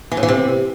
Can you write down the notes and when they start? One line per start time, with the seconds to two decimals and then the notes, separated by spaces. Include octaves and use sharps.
0.12 E3
0.17 A2
0.23 E3
0.28 C3